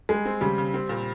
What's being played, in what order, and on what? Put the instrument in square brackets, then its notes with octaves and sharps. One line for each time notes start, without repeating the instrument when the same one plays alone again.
[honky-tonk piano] G3 [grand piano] G#3
[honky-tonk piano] C4
[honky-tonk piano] C#3 [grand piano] G3
[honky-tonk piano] C#3
C4
A#2